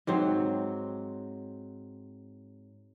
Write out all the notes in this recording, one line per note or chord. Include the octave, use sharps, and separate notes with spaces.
G#2 F#3 C4 C#5